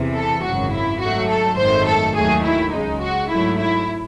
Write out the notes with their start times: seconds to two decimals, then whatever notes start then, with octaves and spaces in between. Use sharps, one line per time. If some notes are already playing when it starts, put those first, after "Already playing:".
Already playing: E2 C3 E3
0.16 A4
0.44 G#1 F#2 C#3 F#3 F#4
0.73 E4
1.01 G#2 F#3 A3 F#4
1.30 A4
1.58 G#1 F#2 D#3 A3 C5
1.88 A4
2.16 D#2 D#3 F#3 A3 G#4
2.45 E4
2.73 C#2 C#3 G#3 D#4
3.02 F#4
3.30 G#2 F#3 A3 E4
3.59 E4